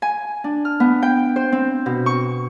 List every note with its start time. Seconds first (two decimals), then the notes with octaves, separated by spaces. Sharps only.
0.02 G#5
0.44 D4
0.65 F6
0.80 B3
1.02 G5
1.36 C5
1.52 C4
1.86 B2
2.06 C#6